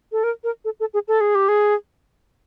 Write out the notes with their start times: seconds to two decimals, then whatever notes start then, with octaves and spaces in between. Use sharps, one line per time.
0.12 A4
0.24 A#4
0.44 A#4
0.65 A4
0.80 A4
0.94 G#4
1.08 A4
1.21 G#4
1.35 G4
1.49 G#4